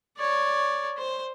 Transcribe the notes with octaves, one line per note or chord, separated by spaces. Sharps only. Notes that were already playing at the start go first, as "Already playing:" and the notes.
C#5 D5
C5